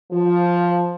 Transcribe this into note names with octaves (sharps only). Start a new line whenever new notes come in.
F3